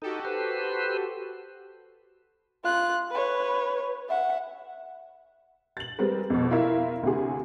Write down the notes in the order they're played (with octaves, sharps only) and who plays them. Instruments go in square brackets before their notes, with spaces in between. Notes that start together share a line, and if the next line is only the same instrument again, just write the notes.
[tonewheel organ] D#4 [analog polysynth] F#4 G4 A4
[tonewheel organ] B4 C5
[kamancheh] F4 F#6
B4 C#5
E5 F#5
[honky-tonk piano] A6 F#7
G3 G#3 C4 A#4 B4
F2 B2
E4 F4 A#4 E5 F5
D2 C3 G#4